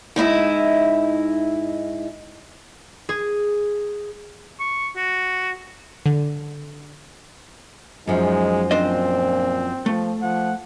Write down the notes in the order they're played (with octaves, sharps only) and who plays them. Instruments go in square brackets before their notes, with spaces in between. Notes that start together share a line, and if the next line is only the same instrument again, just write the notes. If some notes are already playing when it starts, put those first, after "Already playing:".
[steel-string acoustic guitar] G#2 D#4 E4 E5
[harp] G#4
[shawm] C#6
F#4
[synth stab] D3
[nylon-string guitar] F#2 F3 [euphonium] G#3 [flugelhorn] D#4
[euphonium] A#2 [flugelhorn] C4 [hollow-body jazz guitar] D4 C5 D#5
[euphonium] F3 [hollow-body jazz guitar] A3
[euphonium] F3 [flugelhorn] F#5